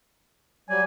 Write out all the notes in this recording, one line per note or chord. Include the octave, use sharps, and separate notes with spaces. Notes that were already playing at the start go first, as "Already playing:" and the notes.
F#3 G3 D5 G#5